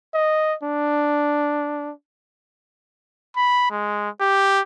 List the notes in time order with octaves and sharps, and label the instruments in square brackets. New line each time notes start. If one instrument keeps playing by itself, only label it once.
[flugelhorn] D#5
D4
[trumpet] B5
G#3
G4